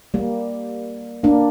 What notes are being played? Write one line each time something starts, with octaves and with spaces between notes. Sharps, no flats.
G3 A#3
A#3 D4